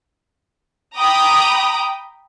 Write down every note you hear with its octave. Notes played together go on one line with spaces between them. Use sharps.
G5 A#5 B5 D6 D#6